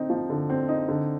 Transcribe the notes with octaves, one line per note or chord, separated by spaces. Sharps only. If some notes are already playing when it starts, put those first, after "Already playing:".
Already playing: D3 C4 D#4
F3
D3
C4
D#4
D3